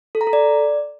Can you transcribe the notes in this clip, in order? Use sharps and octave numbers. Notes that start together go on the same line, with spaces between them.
A4
A#5
A4
D5